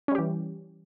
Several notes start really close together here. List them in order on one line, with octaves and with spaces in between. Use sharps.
C#4 G3 G4 E3